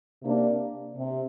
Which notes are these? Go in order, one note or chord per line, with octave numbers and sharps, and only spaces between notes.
C3 A#3 D4
C3